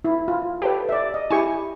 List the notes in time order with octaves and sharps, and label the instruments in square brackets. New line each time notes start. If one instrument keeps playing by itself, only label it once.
[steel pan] E4
F4
[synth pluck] G4 A4 B4
[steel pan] D5 E5
D#5
[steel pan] E4 C#6 [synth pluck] G4 G#5